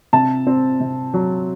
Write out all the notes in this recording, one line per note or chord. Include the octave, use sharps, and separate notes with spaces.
C3 A5
C4
C3
F#3